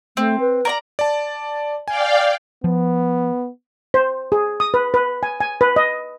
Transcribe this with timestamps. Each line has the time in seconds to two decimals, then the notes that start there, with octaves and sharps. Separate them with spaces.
0.17 A3 C4
0.40 B4
0.65 A#4 D5 A#5
0.99 D5 A5
1.88 D5 F5 G5 G#5
2.64 F3 B3
3.94 C5
4.32 G#4
4.60 D#6
4.74 B4
4.94 B4
5.23 G#5
5.41 G#5
5.61 B4
5.76 D#5